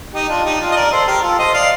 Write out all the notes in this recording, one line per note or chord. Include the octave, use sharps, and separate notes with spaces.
D#4 G4
D4 F4
D#4 G4
D4 F4
D#5
A#4 D5
A4 C5
G4 A#4
F4 A4
C5 D#5
D5 F5